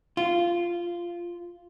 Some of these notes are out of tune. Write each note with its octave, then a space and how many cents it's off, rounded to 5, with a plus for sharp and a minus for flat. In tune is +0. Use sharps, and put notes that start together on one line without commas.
F4 -10